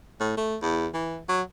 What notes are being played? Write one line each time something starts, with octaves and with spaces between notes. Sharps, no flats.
A2
A3
E2
E3
F#3